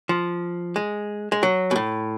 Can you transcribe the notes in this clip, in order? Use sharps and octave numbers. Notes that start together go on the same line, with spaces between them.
F3
G#3
G#3
F#3
B2
A2